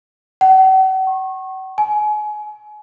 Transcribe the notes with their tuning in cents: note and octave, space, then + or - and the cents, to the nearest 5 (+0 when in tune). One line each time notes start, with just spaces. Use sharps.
F#5 +45
C#6 -30
G#5 +30